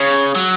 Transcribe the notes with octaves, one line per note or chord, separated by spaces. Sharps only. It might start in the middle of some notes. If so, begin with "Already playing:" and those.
Already playing: C#3 C#5
F#3